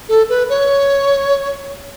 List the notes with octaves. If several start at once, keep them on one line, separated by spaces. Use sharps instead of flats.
A4
B4
C#5